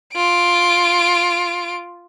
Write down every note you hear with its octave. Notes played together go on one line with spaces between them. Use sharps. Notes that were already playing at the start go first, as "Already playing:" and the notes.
F4 D7